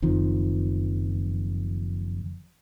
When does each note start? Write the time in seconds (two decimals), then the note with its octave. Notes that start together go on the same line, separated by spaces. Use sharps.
0.02 F#1 F2 D#3 F3